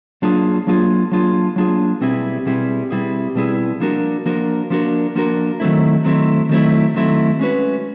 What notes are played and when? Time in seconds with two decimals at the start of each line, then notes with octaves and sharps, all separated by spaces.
0.22 F#3 A#3 D4 F4 G#4
0.67 F#3 A#3 D4 F4 G#4
1.12 F#3 A#3 D4 F4 G#4
1.56 F#3 A#3 D4 F4 G#4
2.01 B2 G3 C4 E4 G#4
2.46 B2 G3 C4 E4 G#4
2.90 B2 G3 C4 E4 G#4
3.35 B2 G3 C4 E4 G#4
3.80 F3 A#3 D4 F#4 A#4
4.26 F3 A#3 D4 F#4 A#4
4.70 F3 A#3 D4 F#4 A#4
5.15 F3 A#3 D4 F#4 A#4
5.60 D#3 F#3 A3 C4 E4
6.04 D#3 F#3 A3 C4 E4
6.49 D#3 F#3 A3 C4 E4
6.94 D#3 F#3 A3 C4 E4
7.39 G#3 C#4 F#4 B4